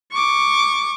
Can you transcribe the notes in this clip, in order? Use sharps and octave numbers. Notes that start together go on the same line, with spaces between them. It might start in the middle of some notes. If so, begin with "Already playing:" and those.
C#6 D6